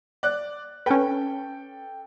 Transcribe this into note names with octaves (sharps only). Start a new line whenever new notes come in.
D5 F#6
C#4 A4 B4 G5